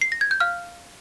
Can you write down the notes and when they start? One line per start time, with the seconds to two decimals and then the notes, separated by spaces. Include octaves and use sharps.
0.01 C7
0.12 A#6
0.21 G#6
0.31 G6
0.40 F5 F6